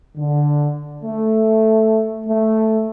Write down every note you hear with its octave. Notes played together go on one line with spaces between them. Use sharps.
D3
A3
A3